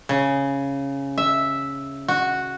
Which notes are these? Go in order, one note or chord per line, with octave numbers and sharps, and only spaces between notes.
C#3
E5
F#4